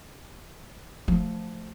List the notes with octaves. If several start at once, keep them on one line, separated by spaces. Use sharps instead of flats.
F3 A3